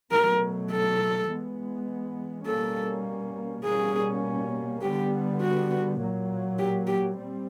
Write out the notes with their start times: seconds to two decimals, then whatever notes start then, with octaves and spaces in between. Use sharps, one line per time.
0.11 B2 F#3 A3 A#4
0.71 A4
1.29 E3 G#3 B3
2.46 B2 G3 A#3 C#4 A4
3.64 B2 G3 A#3 C#4 G#4
4.82 D3 G3 B3 G4
5.41 F#4
5.99 A#2 F#3 A#3
6.59 G4
6.87 G4
7.17 G3 C4